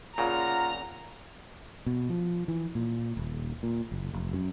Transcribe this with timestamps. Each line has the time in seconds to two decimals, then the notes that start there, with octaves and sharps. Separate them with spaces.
0.18 A#2 C#3 F4 F#5 A#5
1.86 B2
2.09 F3
2.48 E3
2.75 A#2
3.17 D#1
3.63 A#2
3.92 F#1
4.14 F1
4.33 F#2